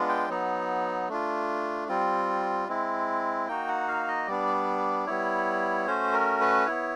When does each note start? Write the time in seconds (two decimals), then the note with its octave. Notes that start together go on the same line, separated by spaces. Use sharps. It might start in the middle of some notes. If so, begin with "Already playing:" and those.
Already playing: G#3 B3 D4 F4
0.09 G5
0.29 F#3 B3 D#4
1.08 A3 D4 F4
1.88 G3 C4 F4
2.68 G#3 C4 E4
3.48 A#3 D#4 F#4 G5
3.68 F#5
3.88 F5
4.08 D#5
4.27 G3 B3 D4 D5
5.07 G3 B3 E4 C#5
5.87 A3 C#4 F#4 C5
6.13 A#4
6.41 B4
6.66 B3 E4 C#5